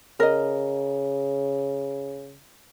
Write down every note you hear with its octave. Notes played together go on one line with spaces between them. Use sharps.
C#3 A#4 D#5